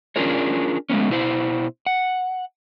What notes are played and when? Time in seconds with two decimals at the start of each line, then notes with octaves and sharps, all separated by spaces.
0.16 C#4 D4 F4 G#4 A#4 C#5
0.90 G#3 A3 B3 C#4
1.10 B2 E4 C5
1.86 F#5